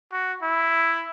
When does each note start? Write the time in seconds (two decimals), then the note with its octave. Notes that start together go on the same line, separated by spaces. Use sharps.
0.12 F#4
0.42 E4